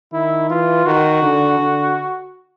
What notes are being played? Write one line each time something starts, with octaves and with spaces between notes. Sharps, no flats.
D#3 E4
E3 F4
D#3 F#4
D3
D3